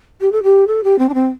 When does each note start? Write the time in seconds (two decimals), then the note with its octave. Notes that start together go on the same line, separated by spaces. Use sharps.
0.21 G4
0.32 A4
0.43 G4
0.67 A4
0.84 G4
0.99 C4
1.09 D4
1.14 C4